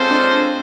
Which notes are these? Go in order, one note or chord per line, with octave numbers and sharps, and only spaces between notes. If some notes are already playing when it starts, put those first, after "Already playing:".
Already playing: G#3 C4 C#4 F4 A4 C5
D4